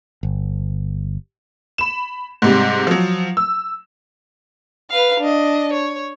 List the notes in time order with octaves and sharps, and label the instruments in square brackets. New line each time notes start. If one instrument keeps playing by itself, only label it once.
[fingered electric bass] G1
[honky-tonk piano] B5 E7
G#2 C3 G3
F3 F#3
E6
[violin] B4 F5
D4 D#5
C#5